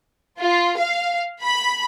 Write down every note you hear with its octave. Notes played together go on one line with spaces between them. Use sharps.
F4
F5
B5